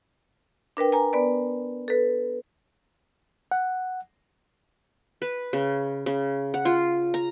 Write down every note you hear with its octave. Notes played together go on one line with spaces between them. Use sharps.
D4 A#4 B4 G5
G#5 A#5
B3 B4 D5
A4 B4
F#5
B4
C#3
C#3
F#5
F4
A#5